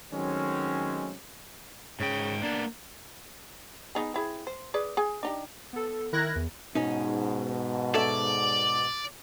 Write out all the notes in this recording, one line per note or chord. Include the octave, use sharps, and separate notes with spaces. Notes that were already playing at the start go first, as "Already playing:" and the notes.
D#3 F#3 G#3 A3 C4 C#4
G#2 C#3 G5
A#3 B3 D4
B3 D#4 G#4
C4 E4 G#4
C5
G#4 B4 D5
G#4 G#5
D4 D#4 G4
B3 A4
D#3 E4 A#4 F#6 G#6 A#6
E2
G#2 B2 C#4 D#4
A4 C#5 D5 E5